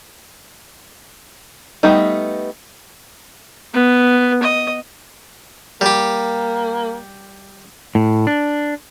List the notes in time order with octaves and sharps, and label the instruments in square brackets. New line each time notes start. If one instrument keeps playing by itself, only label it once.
[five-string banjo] G3 A3 B3 D#4
[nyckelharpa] B3
D#5
[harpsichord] G3 G4 [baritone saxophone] A#3
[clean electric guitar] A2
D4